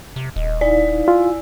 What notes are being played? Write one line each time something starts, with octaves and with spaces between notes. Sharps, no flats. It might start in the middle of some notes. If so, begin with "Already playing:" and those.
C3
D#1 D#5
D#4 E4 D5 F5
E4 F4 G#5 E6